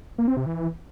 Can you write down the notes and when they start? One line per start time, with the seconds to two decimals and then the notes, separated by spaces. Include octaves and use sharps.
0.18 A#3
0.28 C4
0.37 C3
0.46 E3